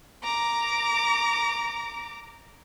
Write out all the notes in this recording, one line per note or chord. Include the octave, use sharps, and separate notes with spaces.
A#5 D6